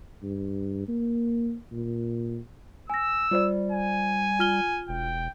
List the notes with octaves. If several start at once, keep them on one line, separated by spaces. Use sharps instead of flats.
G2
A#3
A#2
G#5 E6 A#6
G3 F4 C5 D5
G#5
F4 F6 G7
E1 G5